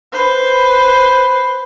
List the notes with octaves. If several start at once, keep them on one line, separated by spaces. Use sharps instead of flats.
B4 C5